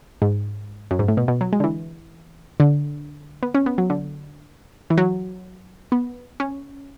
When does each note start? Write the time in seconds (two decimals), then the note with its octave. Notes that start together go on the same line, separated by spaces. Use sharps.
0.22 G#2
0.91 F#2
0.99 G#2
1.08 A2
1.17 B2
1.28 B2
1.41 F#3
1.53 G#3
1.60 D3
1.64 E3
2.60 D3
3.43 B3
3.55 C#4
3.66 B3
3.78 F#3
3.90 D3
4.90 E3
4.98 F#3
5.92 B3
6.40 C#4